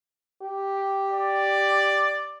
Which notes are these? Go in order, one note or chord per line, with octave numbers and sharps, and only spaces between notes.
G4
D5